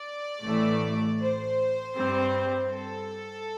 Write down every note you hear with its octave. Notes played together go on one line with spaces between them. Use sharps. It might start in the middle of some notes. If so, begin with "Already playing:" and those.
Already playing: D5
A1 A2 E3 A3
C5
G2 G3 C4
A4